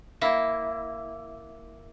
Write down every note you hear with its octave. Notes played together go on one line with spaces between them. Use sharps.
A#3 E4